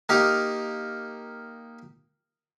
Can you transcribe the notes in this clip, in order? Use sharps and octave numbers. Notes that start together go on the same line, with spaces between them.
A#3 D#4 G4 A#4